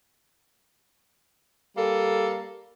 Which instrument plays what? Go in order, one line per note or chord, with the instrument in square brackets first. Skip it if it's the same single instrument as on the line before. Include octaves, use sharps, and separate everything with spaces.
[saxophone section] G3 A#3 A4